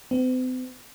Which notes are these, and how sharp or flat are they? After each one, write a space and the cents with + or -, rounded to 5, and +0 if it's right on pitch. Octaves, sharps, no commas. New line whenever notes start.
C4 -45